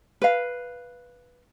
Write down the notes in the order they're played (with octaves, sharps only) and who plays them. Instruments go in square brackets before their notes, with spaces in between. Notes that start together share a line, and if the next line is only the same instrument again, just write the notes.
[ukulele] B4 F5